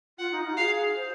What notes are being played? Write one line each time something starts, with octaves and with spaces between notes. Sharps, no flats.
F4 F#5
D#4
F4
F#4
G#4 F5
C5